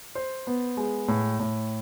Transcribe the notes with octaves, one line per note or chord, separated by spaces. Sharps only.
C5
B3
G#3
A2
A2